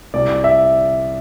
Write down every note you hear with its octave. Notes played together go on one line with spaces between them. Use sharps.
C2 D5
E5